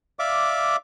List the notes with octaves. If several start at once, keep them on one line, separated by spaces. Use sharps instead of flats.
D5 E5 F5 D6